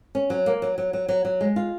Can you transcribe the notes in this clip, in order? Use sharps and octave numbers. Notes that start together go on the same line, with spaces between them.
C#4
F#3
A#3
F#3
F#3
F#3
F#3
F#3
G#3
F4